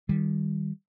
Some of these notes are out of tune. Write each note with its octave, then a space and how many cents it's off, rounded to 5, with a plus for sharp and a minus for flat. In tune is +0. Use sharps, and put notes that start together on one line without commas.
D#3 +0 G3 +0